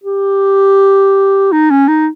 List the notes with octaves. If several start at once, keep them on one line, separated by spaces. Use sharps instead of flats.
G4
D#4
C#4
D#4